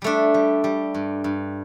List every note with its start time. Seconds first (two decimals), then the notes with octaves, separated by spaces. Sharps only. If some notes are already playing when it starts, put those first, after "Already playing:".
0.02 G3 A3 D4
0.34 G3
0.64 G3
0.94 G2
1.24 G2